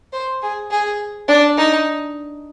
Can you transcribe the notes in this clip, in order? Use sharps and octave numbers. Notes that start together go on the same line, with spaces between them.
C5
G#4
G#4
D4
D#4